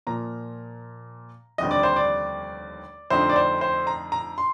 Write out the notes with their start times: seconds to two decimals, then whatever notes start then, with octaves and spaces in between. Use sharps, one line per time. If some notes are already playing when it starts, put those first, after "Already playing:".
0.07 A#2 F3 A#3 A#5
1.58 F1 D#2 D3 G3 C4 D#5
1.71 D5
1.83 C5
1.96 D5
3.10 F2 D3 A3 C4 D#4 C5
3.29 D5
3.36 C5
3.61 C5
3.87 A#5
4.12 A#5
4.38 C6